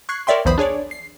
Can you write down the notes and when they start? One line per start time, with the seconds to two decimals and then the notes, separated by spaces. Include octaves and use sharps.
0.09 C#6 F#6 G#6 C7
0.27 A#4 C#5 D5 E5 G5 C6
0.45 B1 E2 E3 C5 B5 D#6
0.58 D4 G#4 C#5 D5
0.91 C7